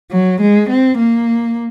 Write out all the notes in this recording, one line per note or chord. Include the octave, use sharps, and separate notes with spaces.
F#3
G#3
C4
A#3